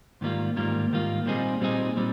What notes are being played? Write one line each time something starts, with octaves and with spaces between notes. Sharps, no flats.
G#2 D#3 G3 A#3 F4
G#2 D#3 G3 A#3 F4
G#2 D#3 G3 A#3 F4
A#2 G3 C4 D#4 G#4
A#2 G3 C4 D#4 G#4
A#2 G3 C4